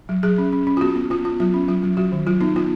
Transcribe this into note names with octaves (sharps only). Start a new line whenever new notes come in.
F#3
F#3 G#4
C#4
C#4
C#4
F4
B3 F#4
B3
B3 F4
B3 F4
F#3 F4
C#4
F#3 F4
F#3
F#3 F#4
D#3
F#3 F4
B3 D#4
B3 F4